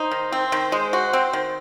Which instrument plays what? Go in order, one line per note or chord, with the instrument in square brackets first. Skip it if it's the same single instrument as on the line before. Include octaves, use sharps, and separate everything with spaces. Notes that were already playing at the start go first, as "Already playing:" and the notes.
Already playing: [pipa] D#4 [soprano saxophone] C5
[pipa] D#3
C4
D#3
G#3
F#4
C4
D#3